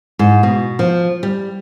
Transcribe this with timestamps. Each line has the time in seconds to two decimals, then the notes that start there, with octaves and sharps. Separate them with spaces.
0.19 G#2
0.43 B2
0.79 F3
1.23 G3